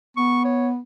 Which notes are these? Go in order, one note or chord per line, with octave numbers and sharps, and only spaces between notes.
B3 C#6
C#5